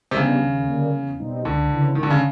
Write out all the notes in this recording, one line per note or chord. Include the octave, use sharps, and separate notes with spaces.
C3
C#3 G3 B3 D4
D#2
D3 G3 A#3
E2
B2 G3 C4 D#4
C#2 D3
C#3 E3
G#1 D#3
D3
C#3